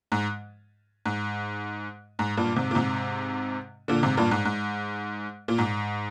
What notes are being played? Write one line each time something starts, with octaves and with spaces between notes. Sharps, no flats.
G#2
G#2
G#2
G2 A#2
G#2 C3
A#2
G#2 C3
A#2 D3
G#2 C3
G2 A#2
G#2
G#2
A#2
G#2